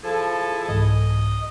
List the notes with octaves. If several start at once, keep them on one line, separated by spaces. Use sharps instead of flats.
F3 E4 G#4 A4
C2 G#2 E3 D#5